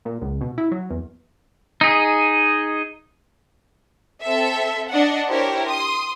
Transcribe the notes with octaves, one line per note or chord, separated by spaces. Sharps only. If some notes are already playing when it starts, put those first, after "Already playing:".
A#2
C#2
B2
E4
F#3
E2
D#4 G#4
C4 A4 E5
D4 D#5 F#5
D4 E4 G4 A#4 C5 C#5
C6 D#6